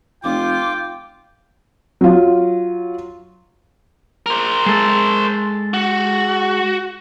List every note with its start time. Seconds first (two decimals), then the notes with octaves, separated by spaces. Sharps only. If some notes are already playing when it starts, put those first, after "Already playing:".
0.24 F1 F4 G5 D6
2.01 F#3 F4
4.26 A#4 C5
4.66 G#3 A4
5.74 F#4